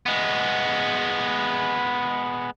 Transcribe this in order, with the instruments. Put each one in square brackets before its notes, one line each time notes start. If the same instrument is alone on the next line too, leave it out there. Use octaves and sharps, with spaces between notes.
[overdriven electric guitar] G#3 B3